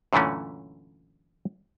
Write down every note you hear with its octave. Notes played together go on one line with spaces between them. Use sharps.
F#2 A#2 D3 E3 A3 C#4